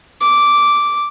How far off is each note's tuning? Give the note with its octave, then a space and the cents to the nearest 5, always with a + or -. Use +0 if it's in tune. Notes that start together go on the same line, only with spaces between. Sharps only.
D6 -5